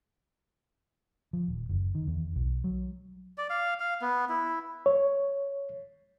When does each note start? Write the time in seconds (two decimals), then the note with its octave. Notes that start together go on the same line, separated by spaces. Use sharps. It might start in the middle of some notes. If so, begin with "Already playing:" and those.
1.33 F3
1.48 D#1
1.69 F#1
1.95 D#3
2.07 E2
2.36 B1
2.64 F#3
3.38 D5
3.50 F5
3.80 F5
4.02 B3
4.30 E4
4.86 C#5